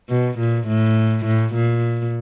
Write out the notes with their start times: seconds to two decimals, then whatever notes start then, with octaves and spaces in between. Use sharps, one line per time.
0.09 B2
0.39 A#2
0.68 A2
1.26 A2
1.55 A#2